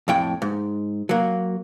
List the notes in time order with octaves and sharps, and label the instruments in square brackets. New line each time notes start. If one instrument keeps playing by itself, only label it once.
[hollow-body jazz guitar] F2 A2 G5
G#2
F#3 A#3